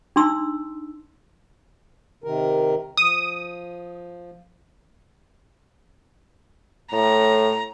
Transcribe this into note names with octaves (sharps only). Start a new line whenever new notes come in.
D4 D#4 C6 E6
C3 D#3 A#4
F3 D#6
A2 A#5